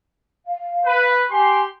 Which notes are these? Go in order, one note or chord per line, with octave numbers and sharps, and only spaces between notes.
F5
B4
G4 G#5 C6